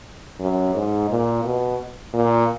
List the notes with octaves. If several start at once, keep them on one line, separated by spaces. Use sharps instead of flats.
F#2
G#2
A#2
B2
A#2